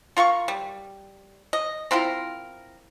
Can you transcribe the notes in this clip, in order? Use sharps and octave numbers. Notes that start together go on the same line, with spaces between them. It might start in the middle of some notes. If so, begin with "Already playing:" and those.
F4 A#4 C6 C#6
G3
D#5
C4 E4 F4 A#4